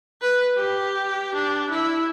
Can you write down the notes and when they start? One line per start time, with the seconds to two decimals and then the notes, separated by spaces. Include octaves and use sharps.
0.22 B4
0.56 G4
1.34 D4
1.70 E4